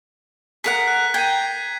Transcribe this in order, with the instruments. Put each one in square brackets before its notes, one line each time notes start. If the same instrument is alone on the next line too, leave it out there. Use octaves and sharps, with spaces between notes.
[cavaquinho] G#4 A#4 F#5 [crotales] B6
[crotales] F#6
[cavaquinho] G5 A#5 [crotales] G#6 C7 D#7